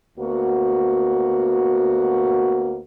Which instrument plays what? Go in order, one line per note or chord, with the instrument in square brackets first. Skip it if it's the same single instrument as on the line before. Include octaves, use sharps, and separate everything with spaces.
[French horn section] D2 A#3 B3 F#4